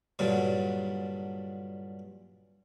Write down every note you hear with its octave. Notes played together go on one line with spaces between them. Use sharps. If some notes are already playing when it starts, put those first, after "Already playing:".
G2 A#2 D3 F#3